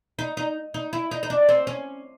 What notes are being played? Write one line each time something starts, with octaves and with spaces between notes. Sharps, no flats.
D#4
D#4
D#4
E4
D#4
D#4
D4
C4
C#4